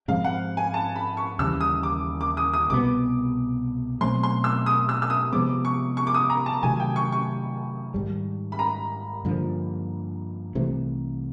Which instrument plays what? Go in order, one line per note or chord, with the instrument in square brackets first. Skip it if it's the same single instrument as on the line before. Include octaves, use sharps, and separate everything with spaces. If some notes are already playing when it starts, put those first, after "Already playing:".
[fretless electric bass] G#2 F3 G#3 C4 [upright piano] F5
[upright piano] F#5
G#5
A5
B5
C#6
[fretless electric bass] D#2 C#3 E3 G3 [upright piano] E6
[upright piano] D#6
D6
D6
D#6
D#6
[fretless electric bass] C2 B2 G#3 B3 [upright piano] D6
[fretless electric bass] B2 F#3 A3 C4 [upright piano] C6
[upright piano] C6
E6
D#6
E6
E6
D#6
[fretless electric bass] C3 F3 G#3 B3 [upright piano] D6
[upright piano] C#6
C#6
D6
D#6
A#5
A5
[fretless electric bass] C3 D#3 F#3 A3 [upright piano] G#5
[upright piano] G5
C#6
C#6
[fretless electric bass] G#2 D#3 G3
[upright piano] B5
A#5
[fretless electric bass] G2 D3 F3 A#3
C2 C3 E3 A3